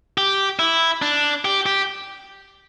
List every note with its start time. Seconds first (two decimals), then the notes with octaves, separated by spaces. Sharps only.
0.18 G4
0.59 E4
1.02 D4
1.45 G4
1.66 G4